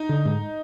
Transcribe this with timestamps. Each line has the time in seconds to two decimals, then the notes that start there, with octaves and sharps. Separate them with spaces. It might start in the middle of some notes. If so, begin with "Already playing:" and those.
Already playing: D#4
0.09 D3
0.25 G#2